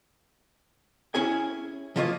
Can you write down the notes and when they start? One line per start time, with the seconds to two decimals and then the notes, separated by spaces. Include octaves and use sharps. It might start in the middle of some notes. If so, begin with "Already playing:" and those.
1.15 C#4 E4 G#4 G#5
1.96 F3 A#3 F4 C#5 D#5